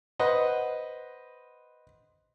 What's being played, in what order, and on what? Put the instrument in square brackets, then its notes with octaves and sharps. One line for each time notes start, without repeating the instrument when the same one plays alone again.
[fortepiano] B4 C5 D#5 F#5